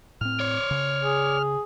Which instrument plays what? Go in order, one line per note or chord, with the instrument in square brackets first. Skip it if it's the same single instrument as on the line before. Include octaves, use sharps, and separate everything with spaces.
[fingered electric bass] A2 C4 [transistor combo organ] F6
[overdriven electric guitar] C#5 D5
[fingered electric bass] C#3
[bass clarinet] G#4